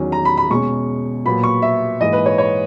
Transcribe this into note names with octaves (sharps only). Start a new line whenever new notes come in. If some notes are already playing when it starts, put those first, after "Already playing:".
Already playing: E2 D#3 F#3 C#4
A#5
B5
B5
B2 G#3 C#4 C#6
A#2 F#3 B3 B5
C#6
E5
G#2 E3 A#3 D#5
B4
C#5
C#5